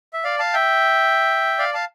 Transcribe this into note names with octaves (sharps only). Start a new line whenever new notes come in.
E5
D5 F5
F5 A5
E5 G5
D5 F5
F5 A5